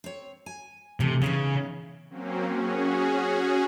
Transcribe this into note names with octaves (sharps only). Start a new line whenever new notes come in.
C4 C#5
G#5
D2 C3 E3 A3
C#3 E3 B3 D#4
F#3 A#3 C4 C#4
C#4 F#4 G#4